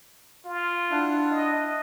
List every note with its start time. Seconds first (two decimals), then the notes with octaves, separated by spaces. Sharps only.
0.45 F4
0.90 D4 E4 F#5
1.31 D#5